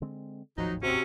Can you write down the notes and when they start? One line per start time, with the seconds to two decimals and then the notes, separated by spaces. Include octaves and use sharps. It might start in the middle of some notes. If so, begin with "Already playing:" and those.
0.02 D3 G#3 C4
0.58 G#1 D#2 A2 F3 F#3 D#4
0.83 C3 C#4 F#4